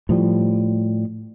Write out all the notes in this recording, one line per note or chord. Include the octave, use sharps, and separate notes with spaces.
A2 F3 G3